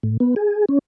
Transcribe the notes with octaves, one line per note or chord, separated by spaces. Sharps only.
A2
B3
G#4
C#4